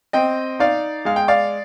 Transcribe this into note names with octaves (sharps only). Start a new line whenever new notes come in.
C4 D#5 G5
D#4 D5 F5
G#3 F5
G5
D5 F5